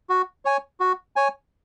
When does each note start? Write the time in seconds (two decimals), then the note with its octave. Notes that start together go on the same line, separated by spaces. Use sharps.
0.10 F#4
0.45 C#5 G#5
0.80 F#4
1.16 C#5 G#5